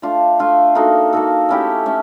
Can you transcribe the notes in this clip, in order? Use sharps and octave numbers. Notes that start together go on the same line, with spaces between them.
A3 D4 F4
A3 D4 F4
A#3 D#4 F#4 A4
A#3 D#4 F#4 A4
A3 C#4 E4 G4
A3 C#4